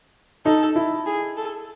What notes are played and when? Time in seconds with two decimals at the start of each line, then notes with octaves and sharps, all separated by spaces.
0.45 D#4 A4
0.76 E4
1.06 G#4
1.37 A4